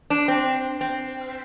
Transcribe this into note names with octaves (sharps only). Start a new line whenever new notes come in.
D4
C4
C4